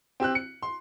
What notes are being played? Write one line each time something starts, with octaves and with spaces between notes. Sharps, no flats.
C4 G4 E6 F#6
C#7
C6